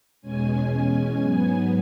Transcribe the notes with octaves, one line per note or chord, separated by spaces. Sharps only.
E2 B2 G#3 C#4 G#5
G#5
G#2 F#3 B3 G#5